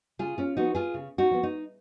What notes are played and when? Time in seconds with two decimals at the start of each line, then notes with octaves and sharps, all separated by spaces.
0.19 C#3 F4 G#4
0.38 C#4 F4
0.57 F3 B3 D#4 F#4
0.75 F4 G#4
0.94 C#3
1.18 D#4 F#4
1.31 F3 B3
1.43 D#4